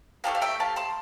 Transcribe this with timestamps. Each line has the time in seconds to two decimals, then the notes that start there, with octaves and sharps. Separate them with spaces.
0.24 A3 D4 G4 F5 A5
0.35 F5
0.42 E5 G5
0.60 F5 A5
0.76 A5 C6